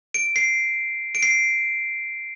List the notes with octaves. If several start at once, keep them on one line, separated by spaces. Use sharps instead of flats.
D7
C7
D7
C7